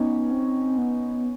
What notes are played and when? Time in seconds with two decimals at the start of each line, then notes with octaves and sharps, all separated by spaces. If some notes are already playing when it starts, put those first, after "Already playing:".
Already playing: B3 C#4 D#4
0.31 C4
0.77 B3